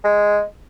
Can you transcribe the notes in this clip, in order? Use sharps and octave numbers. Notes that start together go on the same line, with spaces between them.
G#3